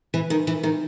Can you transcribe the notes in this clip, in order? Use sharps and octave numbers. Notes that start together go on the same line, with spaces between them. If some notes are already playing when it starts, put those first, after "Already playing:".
E3
D#3
E3
D#3